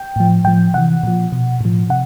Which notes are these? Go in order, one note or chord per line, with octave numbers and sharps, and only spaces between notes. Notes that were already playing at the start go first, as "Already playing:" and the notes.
Already playing: G5
A2 F3
A2 F3 G5
C3 E3 F#5
A#2 F3
B2
A2 F3
C3 F#5